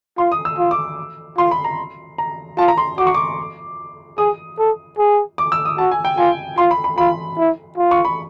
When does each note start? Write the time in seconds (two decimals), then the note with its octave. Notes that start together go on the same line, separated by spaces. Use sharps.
0.18 F4 C6
0.32 D#6
0.45 E6
0.58 F4
0.71 D6
1.38 F4 C6
1.51 B5
1.64 A#5
2.18 A#5
2.58 F4 A5
2.68 A#5
2.78 C6
2.98 F#4 D6
3.07 C#6
3.14 D6
4.18 G#4 D#6
4.59 A4
4.98 G#4
5.38 D6
5.52 E6
5.65 D#6
5.78 F#4 A5
5.92 G#5
6.05 G5
6.18 F4 G#5
6.58 F4 C6
6.71 B5
6.84 B5
6.98 F4 B5
7.38 E4
7.77 F4
7.91 C#6
8.05 B5